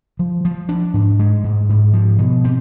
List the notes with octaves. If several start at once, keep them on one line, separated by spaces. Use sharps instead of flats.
F3
F3
D4
G#2
G#3
G#2
G#2
F3
B2
C4